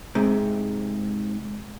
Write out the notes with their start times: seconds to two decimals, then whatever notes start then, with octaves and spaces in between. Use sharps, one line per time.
0.15 G#2 C3